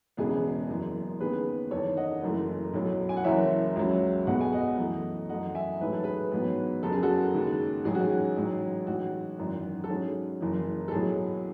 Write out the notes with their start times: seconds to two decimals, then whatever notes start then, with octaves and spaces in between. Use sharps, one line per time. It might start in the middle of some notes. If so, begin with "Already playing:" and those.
0.17 E1 E2 C#3 G#3 B3 G#4
0.69 F#1 F#2 E3
1.20 D#2 C#3 G#3 B3 G#4 B4
1.71 F#1 E2 D#3 A4 C#5
1.97 D#5 F#5
2.22 F#1 F#2 E3 A3
2.74 B1 A2 F#3
3.09 G#5
3.17 F#5
3.24 F#1 F#2 E3 C#5 E5
3.76 C#2 C#3 F#3
4.27 B1 B2 G#3 B3 F#5
4.41 G#5
4.52 D#5 F#5
4.78 F#2 E3 A3
5.29 F#2 E3 A3 D#5 F#5
5.55 E5 G#5
5.80 A1 G#2 F#3 A3 B4
5.92 A4
6.04 G#4 B4
6.32 A1 G#2 F#3 B3
6.83 F#1 F#2 C#3 A4
6.92 G#4
7.03 F#4 A4
7.34 D#2 C#3 G#3
7.84 A1 G#2 F#3 C#4 G#4
7.95 F#4
8.05 G#4
8.37 A1 G#2 F#3
8.87 A1 G#2 F#3 F#4
9.39 G#1 F#2 E3
9.84 A4
9.89 G#2 F#3 C#4 G#4
10.41 F#1 F#2 E3
10.88 A4
10.91 B1 A2 F#3 G#4